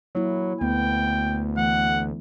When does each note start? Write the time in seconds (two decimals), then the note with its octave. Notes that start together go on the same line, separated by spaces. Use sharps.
0.15 F#3 A#3 E4
0.61 D2 B3 G5
1.58 E3 A3 F#5